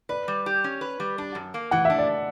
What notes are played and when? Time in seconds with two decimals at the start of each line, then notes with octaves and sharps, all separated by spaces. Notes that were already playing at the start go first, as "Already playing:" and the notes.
0.09 B4 D5
0.28 G3
0.46 G4
0.64 C#4
0.81 B4
1.00 G3
1.18 D4
1.35 F#2
1.54 A#3
1.71 E3 F#5
1.85 E5
1.90 D4
1.99 D5